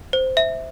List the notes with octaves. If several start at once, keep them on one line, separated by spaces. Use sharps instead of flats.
C5
E5